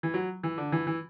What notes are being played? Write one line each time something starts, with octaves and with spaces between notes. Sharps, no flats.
E3
F#3
E3
D3
E3
E3